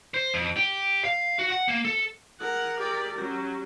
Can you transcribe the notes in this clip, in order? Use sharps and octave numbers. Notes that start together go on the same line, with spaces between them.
C5
F2
G4
F5
F#4
F#5
A#3
A4
G#4 A#4 F#5
G4 D5
F#3 C#4 G4